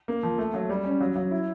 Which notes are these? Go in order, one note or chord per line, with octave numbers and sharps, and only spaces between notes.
A#3
F3
A3
F#3
G3
C#4
F#3
F#3
E4